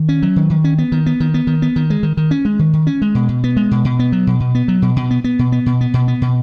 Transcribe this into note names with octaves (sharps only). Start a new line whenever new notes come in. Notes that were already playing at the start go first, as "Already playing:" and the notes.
Already playing: D#3
C#4
F#3
D#3
D#3
C#4
B3
D#3
B3
D#3
B3
D#3
B3
D#3
G#3
D#3
D#3
C#4
G#3
D#3
D#3
C#4
G#3
B2
B2
B3
G#3
B2
B2
B3
F#3
B2
B2
B3
F#3
B2
B2
B3
B3
B2
B3
B2
B3
B2
B3
B2